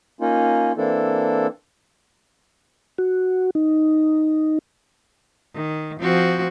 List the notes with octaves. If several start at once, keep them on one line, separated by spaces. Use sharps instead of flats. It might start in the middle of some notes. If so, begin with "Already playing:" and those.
A#3 C#4 D#4 F4
E3 A#3 C4 D4 E4 A4
F#4
D#4
D#3
F3 C4 F#4